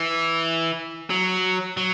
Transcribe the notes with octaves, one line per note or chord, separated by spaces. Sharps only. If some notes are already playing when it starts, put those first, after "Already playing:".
Already playing: E3
F#3
F#3